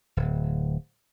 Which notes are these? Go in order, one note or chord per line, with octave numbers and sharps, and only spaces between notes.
D1